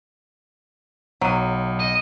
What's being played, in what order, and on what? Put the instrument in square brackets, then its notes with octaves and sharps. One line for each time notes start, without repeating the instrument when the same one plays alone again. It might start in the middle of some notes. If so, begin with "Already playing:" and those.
[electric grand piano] B1 D#7 [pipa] F#3
[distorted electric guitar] D#5